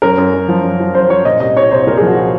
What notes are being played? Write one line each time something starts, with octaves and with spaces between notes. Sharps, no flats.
F#2 A#4
F#2
F#2
F3
F#2
F3
F#2 C5
F3 C#5
A#2 D#5
C2 D#5
C2 C#5
C2 C5
A#2 A#4
G#4
F3
F#4